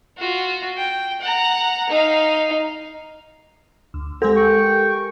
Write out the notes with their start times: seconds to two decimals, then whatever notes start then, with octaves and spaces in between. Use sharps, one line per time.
0.18 F4 F#4
0.77 G5
1.21 F#5 A#5
1.89 D#4 F5
3.94 D2
4.22 G#3 C4 G4 A4 A#4
4.36 G5 C#6